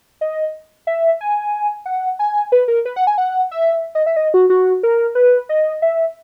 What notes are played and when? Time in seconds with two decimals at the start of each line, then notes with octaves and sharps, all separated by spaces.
0.21 D#5
0.87 E5
1.21 G#5
1.86 F#5
2.19 G#5
2.52 B4
2.68 A#4
2.85 B4
2.96 F#5
3.07 G#5
3.18 F#5
3.51 E5
3.95 D#5
4.06 E5
4.16 D#5
4.34 F#4
4.50 F#4
4.83 A#4
5.15 B4
5.49 D#5
5.82 E5